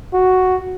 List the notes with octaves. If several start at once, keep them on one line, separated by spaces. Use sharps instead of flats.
F#4